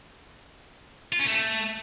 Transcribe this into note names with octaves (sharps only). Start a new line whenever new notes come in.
F4
C#4
A3